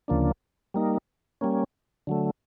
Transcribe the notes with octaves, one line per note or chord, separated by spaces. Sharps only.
D2 C#3 F3 A#3 D4
G3 A#3 D#4
G3 A#3 C#4
D3 F#3 A3